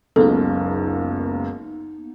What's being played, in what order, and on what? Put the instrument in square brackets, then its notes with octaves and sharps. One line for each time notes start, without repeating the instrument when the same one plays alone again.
[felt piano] F#1 C#2 F#2 [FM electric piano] A#3 B3 D#4 [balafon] A4